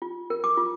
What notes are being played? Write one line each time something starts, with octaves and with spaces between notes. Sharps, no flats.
F4
A#4
D6
F4